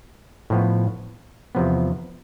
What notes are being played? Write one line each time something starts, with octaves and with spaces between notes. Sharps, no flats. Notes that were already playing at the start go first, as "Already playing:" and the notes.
A2 F3 B3
E2 C3 F3 B3